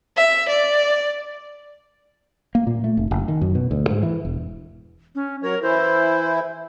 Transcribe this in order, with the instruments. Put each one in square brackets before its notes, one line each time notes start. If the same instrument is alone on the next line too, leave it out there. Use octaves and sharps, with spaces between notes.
[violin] E5
D5
[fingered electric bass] A#3
A#2
A3
F1
F#1
D#3
F#2
B2
D2
G#2
E3
E1
[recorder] C#4
[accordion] F#3 C#5 [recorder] A#4
[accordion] E3 E4 [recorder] C5